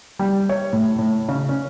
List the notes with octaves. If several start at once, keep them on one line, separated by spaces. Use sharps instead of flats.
G3
C#5
A2
A2
C#3
C#4